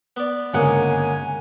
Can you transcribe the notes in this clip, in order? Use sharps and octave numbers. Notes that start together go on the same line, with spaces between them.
B3 D5
G1 C#3 G#3 A#3 F#5 G#5